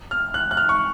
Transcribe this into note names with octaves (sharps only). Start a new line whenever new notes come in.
F6
F#6
F#6
F6
C#6